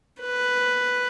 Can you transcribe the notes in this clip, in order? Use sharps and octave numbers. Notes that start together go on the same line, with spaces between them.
B4